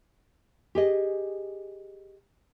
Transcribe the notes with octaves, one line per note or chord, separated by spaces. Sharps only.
G4 G#4 D#5